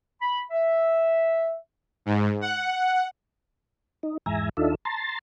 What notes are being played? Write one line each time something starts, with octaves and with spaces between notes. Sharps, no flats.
B5
E5
G#2
F#5
D#4
E2 G#2 E5 G#5 A#5
D#2 D4 D#4 F4 A4 E5
A5 A#5 C6 A6